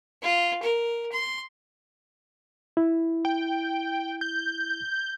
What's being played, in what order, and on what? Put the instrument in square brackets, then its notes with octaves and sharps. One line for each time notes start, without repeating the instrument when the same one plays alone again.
[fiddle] F4
A#4
C6
[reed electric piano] E4
[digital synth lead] G5
G6